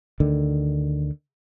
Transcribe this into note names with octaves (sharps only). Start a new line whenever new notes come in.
D2 D3 D#3